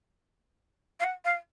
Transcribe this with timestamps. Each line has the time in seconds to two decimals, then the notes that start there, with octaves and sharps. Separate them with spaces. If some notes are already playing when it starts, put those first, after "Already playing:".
1.00 F5
1.04 F#5
1.25 F5